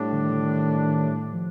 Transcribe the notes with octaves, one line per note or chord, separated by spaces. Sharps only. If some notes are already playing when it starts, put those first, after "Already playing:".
Already playing: A2 G3 D4
D3
D#3
D3
D#3
F3